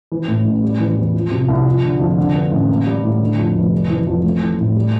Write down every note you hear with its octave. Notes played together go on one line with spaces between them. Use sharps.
E3
A2
A1
G3
E3
E2
F3
C3
C2
F3
D3
F2
D3
G2
A1
A#3
G3
A2
D3
F2
F1
G3
E3
F2
A3
E3
A2
G3